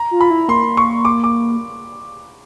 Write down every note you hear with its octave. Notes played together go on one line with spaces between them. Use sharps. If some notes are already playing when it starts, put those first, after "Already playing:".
Already playing: A#5
F4
B5
E4
A#3 C6
C#6
D6
D6